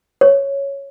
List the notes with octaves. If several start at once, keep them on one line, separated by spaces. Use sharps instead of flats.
C#5